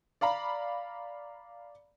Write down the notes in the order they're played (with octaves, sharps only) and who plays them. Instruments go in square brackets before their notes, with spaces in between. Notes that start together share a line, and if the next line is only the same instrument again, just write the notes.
[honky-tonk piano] D5 F5 A#5 B5